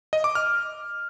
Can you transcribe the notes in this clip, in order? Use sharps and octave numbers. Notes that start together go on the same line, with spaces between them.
D#5
D6
F6